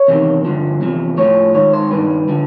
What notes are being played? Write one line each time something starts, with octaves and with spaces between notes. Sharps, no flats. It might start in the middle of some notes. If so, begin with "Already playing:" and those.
Already playing: C#5
E2 C3 D#3
G2 D3 F3
E2 C3 F3
A2 F3 C#5
G#2 D#3 C#5
C5
G2 D#3 B4
D3 F3